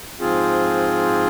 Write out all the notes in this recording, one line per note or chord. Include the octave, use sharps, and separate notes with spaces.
G#2 F3 C4 F4 G#4